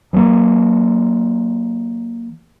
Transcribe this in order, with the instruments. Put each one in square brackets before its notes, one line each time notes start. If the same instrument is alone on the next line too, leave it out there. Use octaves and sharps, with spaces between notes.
[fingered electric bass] E3 F#3 G#3 A#3